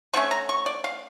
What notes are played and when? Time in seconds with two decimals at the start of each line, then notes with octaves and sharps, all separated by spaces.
0.13 D3 F3 A3 C#4 C#6
0.31 A#5
0.49 C#6
0.66 D5
0.84 F5